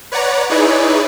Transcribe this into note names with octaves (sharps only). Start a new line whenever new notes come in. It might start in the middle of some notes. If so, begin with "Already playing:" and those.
B4 C#5 D5 F#5 A#5
D#4 E4 G#4 B4 C#5 D5